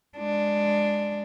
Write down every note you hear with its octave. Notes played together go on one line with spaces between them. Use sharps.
G#3 D4